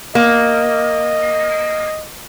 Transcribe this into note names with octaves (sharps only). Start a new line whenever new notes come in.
A#3 D#5